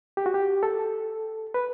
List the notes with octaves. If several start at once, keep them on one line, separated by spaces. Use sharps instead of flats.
G4
F#4
G4
A4
B4